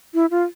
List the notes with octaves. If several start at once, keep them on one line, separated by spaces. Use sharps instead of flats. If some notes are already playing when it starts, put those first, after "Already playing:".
E4
F4